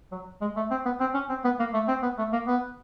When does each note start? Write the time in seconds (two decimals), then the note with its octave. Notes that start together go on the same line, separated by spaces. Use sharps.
0.12 F#3
0.41 G#3
0.57 A3
0.71 C4
0.86 B3
1.00 C4
1.14 C#4
1.30 C4
1.44 B3
1.60 A#3
1.74 A3
1.89 C4
2.03 B3
2.18 A3
2.33 A#3
2.47 B3